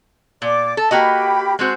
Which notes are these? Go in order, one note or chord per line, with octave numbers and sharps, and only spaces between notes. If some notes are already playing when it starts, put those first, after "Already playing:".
A#2 D5 D6
A4
A#3 F#4 G4 D#5 B5
G#3 C4 F#4 C5 G6